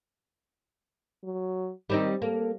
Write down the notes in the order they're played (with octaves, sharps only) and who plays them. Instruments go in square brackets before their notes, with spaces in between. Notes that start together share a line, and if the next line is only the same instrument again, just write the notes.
[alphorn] F#3
[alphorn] D#3 [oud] G3 C4 D#4
[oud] A#3 [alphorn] A4